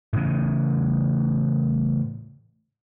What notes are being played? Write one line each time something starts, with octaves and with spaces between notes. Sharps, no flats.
A2 C#3 E3